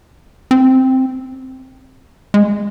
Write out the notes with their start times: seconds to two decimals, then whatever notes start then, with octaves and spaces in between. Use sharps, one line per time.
0.51 C4
2.34 G#3